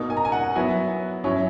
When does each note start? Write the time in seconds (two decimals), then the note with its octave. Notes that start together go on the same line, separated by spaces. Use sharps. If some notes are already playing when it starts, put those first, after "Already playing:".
Already playing: B2 A#3 D#4
0.10 G#5
0.17 A#5
0.25 G#5
0.32 F#5
0.55 F#3 B3 E4 G#5
1.24 F#3 C#4 E4